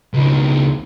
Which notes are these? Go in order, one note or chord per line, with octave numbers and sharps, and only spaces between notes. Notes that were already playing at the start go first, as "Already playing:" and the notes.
C#2 D#3